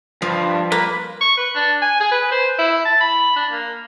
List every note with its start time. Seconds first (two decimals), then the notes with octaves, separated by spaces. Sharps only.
0.22 G2 F3
0.72 A#3 B4
1.21 C#6
1.37 B4
1.55 D4
1.82 G#5
2.00 G#4
2.11 B4
2.31 C5
2.59 E4
2.85 A5
3.01 B5
3.36 D4
3.52 A#3